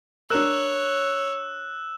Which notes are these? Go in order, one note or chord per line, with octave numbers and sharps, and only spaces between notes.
D4 A#4 C#5 E6 F#6 E7